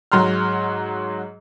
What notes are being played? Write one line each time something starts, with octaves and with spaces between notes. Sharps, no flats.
G#2 F#3 A#5 C6 F6